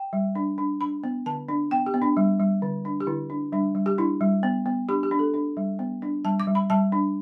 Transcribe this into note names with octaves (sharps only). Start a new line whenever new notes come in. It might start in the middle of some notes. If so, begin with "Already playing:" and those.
Already playing: G5
G3
D4
D4
D4 B5
B3
D3 A5
D4
B3 G5
G4
B3
D4
G3
G3
D3
D4
G4
D3 E4
D4
G3 D4
G3
G4
D4 E4
G3
B3
B3
D4 G4
G4
D4
A4
D4
G3
B3
D4
G3 A5
D6
G3
B5
G3 A5
D4